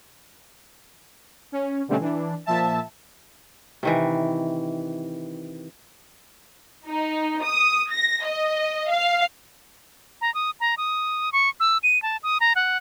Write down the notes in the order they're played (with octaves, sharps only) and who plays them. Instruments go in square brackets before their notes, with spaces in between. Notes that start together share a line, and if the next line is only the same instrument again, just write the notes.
[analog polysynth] C#4
B2 D3 G3 A3 C4 C#4
E3 D4
A#2 F3 E5 A5
[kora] C3 D#3 E3
[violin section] D#4
D#6
A#6
D#5
F5
[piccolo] A#5
D#6
A#5
D#6
C#6
E6
D#7
A5
D#6
A#5
F#5